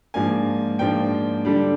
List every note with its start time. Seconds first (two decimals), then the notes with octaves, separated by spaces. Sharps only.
0.14 G#2 F3 A#3 D4 G#5
0.79 G#2 F3 A#3 D4 G5
1.45 D3 G3 D4